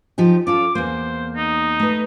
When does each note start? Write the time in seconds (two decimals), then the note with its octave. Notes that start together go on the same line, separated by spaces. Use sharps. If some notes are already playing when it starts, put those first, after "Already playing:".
0.18 F3 D#4 G4
0.47 C#4 F4 A4 D6
0.75 E2 A#3 C5
1.36 D#4
1.80 A3 B4